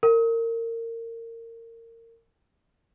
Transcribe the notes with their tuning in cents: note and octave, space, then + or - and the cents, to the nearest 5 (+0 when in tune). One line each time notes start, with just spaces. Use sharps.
A#4 -25